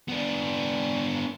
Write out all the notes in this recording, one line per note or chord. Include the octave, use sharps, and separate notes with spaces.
B3 D4